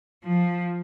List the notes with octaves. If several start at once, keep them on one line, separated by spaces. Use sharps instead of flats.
F3